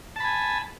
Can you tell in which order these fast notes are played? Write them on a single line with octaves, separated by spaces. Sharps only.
A5 B5 G#5